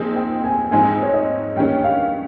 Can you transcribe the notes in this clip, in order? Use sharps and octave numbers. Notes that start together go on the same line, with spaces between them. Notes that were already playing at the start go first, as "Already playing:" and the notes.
Already playing: A#2 F3 C4 D#4 G#4
G5
G#5
G#2 F3 G#3 C4 D#4 G#5
C#5
D#5
G2 D#3 A#3 C#4 G5
F5